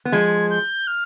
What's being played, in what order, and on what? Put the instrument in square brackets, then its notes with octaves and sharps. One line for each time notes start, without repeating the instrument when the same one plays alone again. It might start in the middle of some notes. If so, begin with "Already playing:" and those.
[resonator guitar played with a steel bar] B3
[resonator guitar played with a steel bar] F3 G#3 [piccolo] G#6
[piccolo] G6
F6